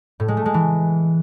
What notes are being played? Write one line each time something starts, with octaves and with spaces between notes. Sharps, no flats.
A2
G#3
A3
G#3
E3